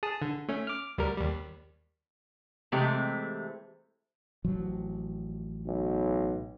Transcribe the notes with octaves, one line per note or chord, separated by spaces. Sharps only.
G#4 A5 D#6
D3
A3 C#4
D6 F6
D2 G3 A#4
D#2 G3
C3 E3 G#3 A3 C4 G4
A1 F3 F#3
B1